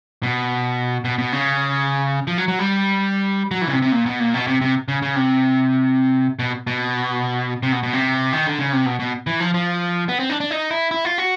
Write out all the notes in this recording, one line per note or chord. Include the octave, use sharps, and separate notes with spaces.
B2
B2
B2
C#3
F3
F#3
F#3
G3
F#3
E3
C#3
C3
C3
A#2
B2
A#2
B2
C3
C3
C#3
C#3
C3
B2
B2
C3
B2
B2
C3
D#3
D3
C#3
C3
B2
B2
E3
F3
F3
B3
C4
D4
D4
D#4
E4
E4
F4
F#4